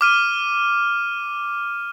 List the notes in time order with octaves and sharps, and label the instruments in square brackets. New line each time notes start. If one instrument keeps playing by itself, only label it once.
[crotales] D6 F6 D#7